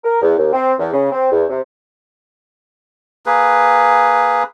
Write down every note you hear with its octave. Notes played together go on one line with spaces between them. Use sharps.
A#4
E2
D#2
C4
E2
C#3
C4
E2
C3
A#3 G#4 B4